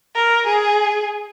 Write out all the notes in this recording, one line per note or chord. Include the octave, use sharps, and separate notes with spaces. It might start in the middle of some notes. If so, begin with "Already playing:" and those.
A#4
G#4